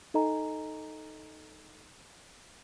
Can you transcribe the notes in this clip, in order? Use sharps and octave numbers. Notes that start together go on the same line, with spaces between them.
D#4 A4 D#5 G#5 A#5